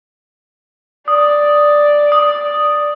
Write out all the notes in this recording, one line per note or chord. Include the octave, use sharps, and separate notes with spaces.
D5 D#6
D#6